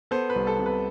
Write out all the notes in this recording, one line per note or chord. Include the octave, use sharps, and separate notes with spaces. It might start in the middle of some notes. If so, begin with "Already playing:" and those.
B3 A4 C5
B4
C2
A4
C3
B4